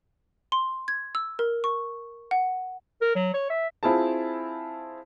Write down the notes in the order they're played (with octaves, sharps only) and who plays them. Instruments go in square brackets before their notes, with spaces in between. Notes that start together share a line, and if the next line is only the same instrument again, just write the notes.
[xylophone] C6
G#6
E6
A#4
C#6
F#5
[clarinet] A#4
F#3
C#5
E5
[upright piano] C4 E4 F4 G#4 A5